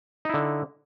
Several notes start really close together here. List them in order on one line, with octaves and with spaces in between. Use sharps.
D#4 E4 D3